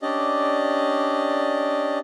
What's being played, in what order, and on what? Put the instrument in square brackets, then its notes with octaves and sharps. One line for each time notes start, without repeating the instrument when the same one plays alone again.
[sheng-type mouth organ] C#4 D4 G4 D5 D#5